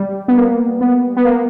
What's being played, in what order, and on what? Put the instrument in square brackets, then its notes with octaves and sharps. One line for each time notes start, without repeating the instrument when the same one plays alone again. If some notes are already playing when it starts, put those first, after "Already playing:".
Already playing: [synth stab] G3
B3
A#3
B3
B3
A#3